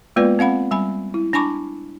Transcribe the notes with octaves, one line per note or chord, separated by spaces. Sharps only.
G#3 A#3 B3 F4 B4 D5
C4 F5 F#5 B5
G3 G#5 B5
E4
D4 G#5 A5 B5 C#6 D6